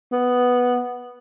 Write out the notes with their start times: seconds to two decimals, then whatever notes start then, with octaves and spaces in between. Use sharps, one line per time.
0.12 B3